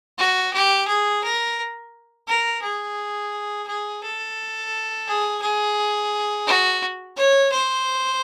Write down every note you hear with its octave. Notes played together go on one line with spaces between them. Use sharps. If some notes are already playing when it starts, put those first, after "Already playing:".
F#4
G4
G#4
A#4
A#4
G#4
G#4
A4
G#4
G#4
F#4
C#5
C5